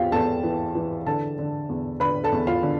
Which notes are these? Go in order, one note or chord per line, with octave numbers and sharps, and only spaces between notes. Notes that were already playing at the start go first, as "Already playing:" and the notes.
Already playing: E2 C3 F4 G4 F5 G5
E2 A4 A5
E3
E3
D3 A4 A5
D3
E2
D3 B4 B5
A4 A5
E2
F4 F5
D3